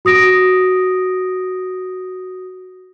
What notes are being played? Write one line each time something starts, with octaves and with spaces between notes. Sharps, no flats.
F#4 D#6 A#6 D7